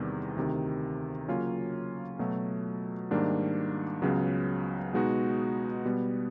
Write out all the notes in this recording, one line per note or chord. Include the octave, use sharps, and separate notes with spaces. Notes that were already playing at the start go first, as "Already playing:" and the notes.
Already playing: E2 C3 D#3 G3 B3
D2 C3 D#3
C#3 F#3 A#3 C#4 F4
B2 F#3 A3
G#2 D#3 G3 A#3 D4
C#2 C#3 F#3 B3
B2 G#3 B3 D#4 F#4
B2 G3 B3